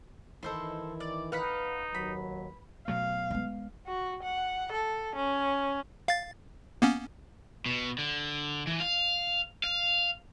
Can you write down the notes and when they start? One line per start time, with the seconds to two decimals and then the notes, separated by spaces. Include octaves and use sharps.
0.43 D#3 E3 D#4 E4 A4 C5 C6
1.00 D5
1.32 D#4 B4 F5 F#5 B5
1.95 D#2 F#3 B5
2.88 B2 F#3 A3 F5
3.30 G#3 B3
3.87 F#4
4.23 F#5
4.72 A4
5.15 C#4
6.08 F5 A6
6.82 A#3 B3 C#4
7.66 B2
7.98 D3
8.67 E3
8.80 F5
9.64 F5